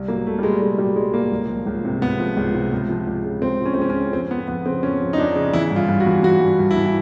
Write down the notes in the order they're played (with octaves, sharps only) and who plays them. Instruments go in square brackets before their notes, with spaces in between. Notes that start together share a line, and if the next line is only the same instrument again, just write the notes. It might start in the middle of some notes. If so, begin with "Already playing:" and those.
Already playing: [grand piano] C2
F#3 A#3
C2 A3
G3
A#2 G#3
C2 G#3
F#3 G3
C2 G#3
A#2 A#3
C#2
F3
C#2
C3
C#2 B3
F3
C#2
C3
C#2
F3
C#2
C#3
C#2 C4
F3
C#4
C4
C#2 C#4
C#4
C#3
F2 C4
F3 B3
F2 B3
C#3 C4
F2 C#4
F3
D#4
F2 D4
C#3
E3 E4
G2
F4
G2
F#4
E3
E3 F#4
G2
G2
E4
E3
E4